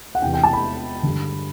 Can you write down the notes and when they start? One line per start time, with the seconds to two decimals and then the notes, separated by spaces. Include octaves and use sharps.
0.15 F#5
0.22 E2 C3 E3 G5
0.33 G5
0.43 A5
0.53 B5
1.03 G2 D3